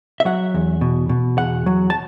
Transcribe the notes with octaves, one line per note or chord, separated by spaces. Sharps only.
E5
F#3 F#5
E2
B2
B2
E2 F#5
F#3
A5